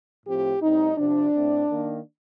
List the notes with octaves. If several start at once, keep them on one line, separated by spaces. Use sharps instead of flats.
A2 F3 C4 G4
A2 G3 C4 D#4
C3 F3 C4 D4
A2 A3 C4
D#3 A#3